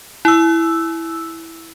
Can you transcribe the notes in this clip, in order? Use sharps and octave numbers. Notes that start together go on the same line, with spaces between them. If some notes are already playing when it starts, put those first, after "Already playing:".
E4 E6